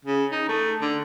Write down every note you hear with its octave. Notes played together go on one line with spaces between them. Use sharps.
C#3
D#4
A3
D3